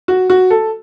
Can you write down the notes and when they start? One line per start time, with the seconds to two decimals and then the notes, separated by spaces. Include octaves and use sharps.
0.08 F#4
0.30 F#4
0.51 A4